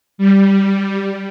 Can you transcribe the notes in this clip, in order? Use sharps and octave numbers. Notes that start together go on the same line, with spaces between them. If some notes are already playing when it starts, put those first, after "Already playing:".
G3